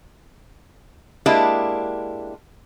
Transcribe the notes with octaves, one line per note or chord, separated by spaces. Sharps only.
G#3 A#3 D4 E4 G4